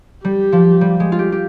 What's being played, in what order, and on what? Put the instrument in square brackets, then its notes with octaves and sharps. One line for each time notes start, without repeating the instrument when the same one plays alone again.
[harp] G3 [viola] G4
[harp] F3
G3
G#3
F4
G4
G4